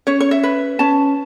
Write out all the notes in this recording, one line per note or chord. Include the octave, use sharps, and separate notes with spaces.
C#4 C#5
C#5
E5
B4
C#4 A5